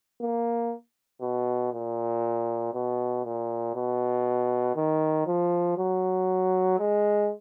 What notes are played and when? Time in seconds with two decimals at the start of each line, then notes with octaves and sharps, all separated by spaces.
0.21 A#3
1.21 B2
1.72 A#2
2.73 B2
3.25 A#2
3.75 B2
4.76 D#3
5.27 F3
5.77 F#3
6.79 G#3